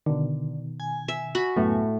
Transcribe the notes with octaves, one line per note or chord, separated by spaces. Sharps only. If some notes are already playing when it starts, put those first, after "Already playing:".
B2 D3 D#3
G#5
E5
F#4 B5
C#2 F#2 A2 B3